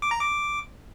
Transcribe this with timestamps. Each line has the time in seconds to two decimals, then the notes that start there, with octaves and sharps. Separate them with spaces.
0.02 D6
0.11 A#5
0.20 D6